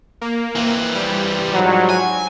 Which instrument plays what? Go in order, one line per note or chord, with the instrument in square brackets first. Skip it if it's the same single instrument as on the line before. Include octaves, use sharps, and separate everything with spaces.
[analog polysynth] A#3
[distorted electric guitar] E3 C4
[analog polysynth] G3
[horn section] G#2 F3 F#3
[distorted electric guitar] G#5